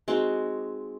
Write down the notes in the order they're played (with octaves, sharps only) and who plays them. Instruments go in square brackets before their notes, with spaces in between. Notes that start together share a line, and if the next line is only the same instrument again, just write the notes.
[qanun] G#3 C4 D#4 F#4